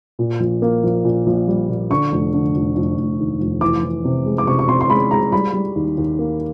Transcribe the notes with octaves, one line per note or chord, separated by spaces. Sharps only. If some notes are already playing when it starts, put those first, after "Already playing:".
A#2
A#1
A#3
A#1
A#2
A#1
G3
A#2
D3 C#6
F1
D3
F1
F1
F1
D#2
F1
E3 D6
E3
C3
G#3
D6
C3 C#6
C#6
C3 C6
C6
G#3 B5
G#3 A#5
G3 B5
G3
D#2
D#2
A#3